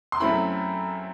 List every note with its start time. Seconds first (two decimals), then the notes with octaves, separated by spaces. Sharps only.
0.12 C6
0.20 F#2 F#3 A3 C4 E4 B5